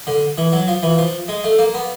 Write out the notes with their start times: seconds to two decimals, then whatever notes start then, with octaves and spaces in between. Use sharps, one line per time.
0.07 D3
0.38 E3
0.52 F#3
0.68 F3
0.83 E3
0.98 F3
1.28 G#3
1.44 A3
1.59 A#3
1.74 B3